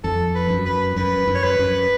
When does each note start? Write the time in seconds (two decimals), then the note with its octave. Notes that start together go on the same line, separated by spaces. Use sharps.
0.04 F2 A4
0.35 B4
0.51 F#2
0.65 B4
0.96 F#2 B4
1.28 F#2
1.35 C#5
1.43 B4
1.59 F#2